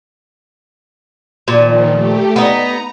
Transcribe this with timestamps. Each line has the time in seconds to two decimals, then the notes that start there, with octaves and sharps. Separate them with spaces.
1.48 A#2 D#3 F3
1.90 A3 G4
2.36 B3 D#4 A#5